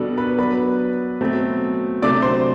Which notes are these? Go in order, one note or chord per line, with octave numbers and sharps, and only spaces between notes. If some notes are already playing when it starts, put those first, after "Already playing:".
Already playing: B2 G3 B3 D4 A4
B4 B5
F#3 B3 D4 B4 B5
B2 F#3 A3 C4
C3 F#3 A3 D4 D5 D6
C5 C6